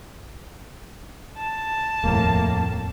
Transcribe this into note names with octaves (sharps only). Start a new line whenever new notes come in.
A5
D#1 F2 A2 A#3